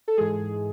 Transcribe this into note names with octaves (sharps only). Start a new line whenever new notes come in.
A4
G#2 E3 G#3 G#4